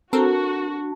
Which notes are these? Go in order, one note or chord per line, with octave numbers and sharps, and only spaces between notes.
C4 D4 F#4 A4 A#4